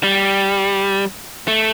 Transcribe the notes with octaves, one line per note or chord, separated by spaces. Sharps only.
G3
A3